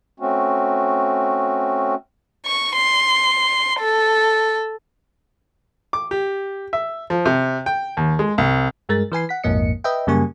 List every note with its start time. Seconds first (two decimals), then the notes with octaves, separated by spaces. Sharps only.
0.20 A3 C4 C#4 F#4
2.46 C#6
2.76 C6
3.79 A4
5.93 D6
6.11 G4
6.73 E5
7.10 F3
7.26 C3
7.66 G5
7.97 D#2
8.19 G#3
8.38 C2
8.89 G2 G#3 A#4 A6
9.12 E3 B4 G#5 C7
9.29 F#5 B6
9.44 A#1 F2 G#2 A#3 D#5 C#7
9.84 B4 D#5 E5 G5
10.07 F#2 C#3 G3 A#3 G#5 C#6